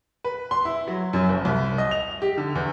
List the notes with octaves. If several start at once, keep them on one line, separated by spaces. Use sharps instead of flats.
B4
C6
E4
F#3
F#2
F#1
C2
D#5
F7
G4
D3
E2